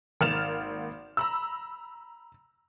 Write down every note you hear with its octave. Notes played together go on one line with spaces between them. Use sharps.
G#1 A#3 F6 A6 E7 F7
A#5 B5 E6